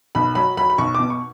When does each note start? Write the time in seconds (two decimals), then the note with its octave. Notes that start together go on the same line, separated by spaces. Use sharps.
0.15 B1 B5
0.35 F#3 B5
0.57 F#3 B5
0.70 B5
0.78 B1 C#6
0.95 D6
1.00 B2
1.10 C#6